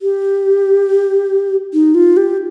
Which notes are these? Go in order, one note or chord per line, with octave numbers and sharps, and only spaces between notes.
G4
D#4
F4
G4